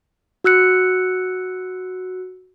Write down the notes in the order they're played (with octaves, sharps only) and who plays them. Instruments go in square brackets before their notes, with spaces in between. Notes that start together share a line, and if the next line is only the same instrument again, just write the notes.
[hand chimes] F#4 E6 F#6 C#7